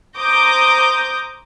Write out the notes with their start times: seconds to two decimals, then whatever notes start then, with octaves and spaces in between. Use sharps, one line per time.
0.18 C5 A#5 D6 D#6 G6 A#6